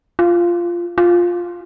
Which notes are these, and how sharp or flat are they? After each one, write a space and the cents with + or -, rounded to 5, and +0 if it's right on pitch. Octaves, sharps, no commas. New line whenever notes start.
F4 -10
F4 +5